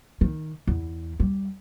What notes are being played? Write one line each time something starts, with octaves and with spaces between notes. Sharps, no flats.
D#3
E2
G3